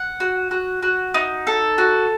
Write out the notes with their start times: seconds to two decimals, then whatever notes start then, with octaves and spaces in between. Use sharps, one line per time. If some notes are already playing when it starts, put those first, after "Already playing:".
Already playing: F#5
0.20 F#4
0.51 F#4
0.83 F#4
1.14 D#4
1.47 A4
1.78 F#4